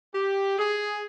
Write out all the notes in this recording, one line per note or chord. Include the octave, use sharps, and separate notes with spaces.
G4
G#4